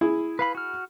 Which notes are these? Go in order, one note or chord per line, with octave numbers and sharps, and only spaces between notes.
E4 G#4
B4 F5 B5
F#4 F6